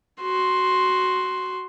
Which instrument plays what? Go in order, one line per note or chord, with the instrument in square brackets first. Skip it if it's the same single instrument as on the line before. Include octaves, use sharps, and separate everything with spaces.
[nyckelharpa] F#4 C6